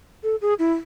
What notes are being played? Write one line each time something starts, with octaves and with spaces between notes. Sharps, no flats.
A4
G#4
E4